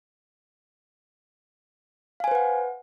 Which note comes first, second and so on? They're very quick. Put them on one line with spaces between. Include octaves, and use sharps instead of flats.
F5 G#5 C5 B4 F#5